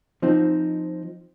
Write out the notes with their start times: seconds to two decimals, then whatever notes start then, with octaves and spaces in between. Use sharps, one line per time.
0.22 F3 C4 D#4